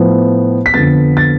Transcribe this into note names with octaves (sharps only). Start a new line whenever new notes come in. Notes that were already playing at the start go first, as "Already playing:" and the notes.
Already playing: A2 F3 B3
B6
F2 D3 F3 B3 A6
A6